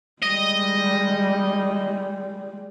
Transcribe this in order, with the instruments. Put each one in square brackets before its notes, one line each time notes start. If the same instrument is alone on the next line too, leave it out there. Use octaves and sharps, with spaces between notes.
[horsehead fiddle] G3 G#3 [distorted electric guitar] D#5